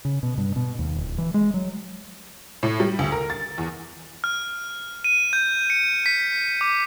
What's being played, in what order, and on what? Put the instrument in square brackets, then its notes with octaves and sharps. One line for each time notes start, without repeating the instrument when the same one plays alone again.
[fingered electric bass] C#3
B2
G2
B2
D#2
D1
E3
G#3
F#3
[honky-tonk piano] A2
G3
D2
A#4
A6
E2
[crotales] F6
D#7
G6
C#7
B6
D6